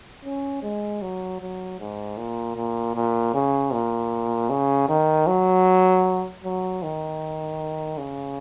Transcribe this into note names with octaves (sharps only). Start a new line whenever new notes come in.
C#4
G#3
F#3
F#3
G#2
A#2
A#2
A#2
C#3
A#2
C#3
D#3
F#3
F#3
D#3
C#3